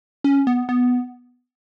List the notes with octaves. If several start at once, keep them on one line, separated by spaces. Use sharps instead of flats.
C#4
B3
B3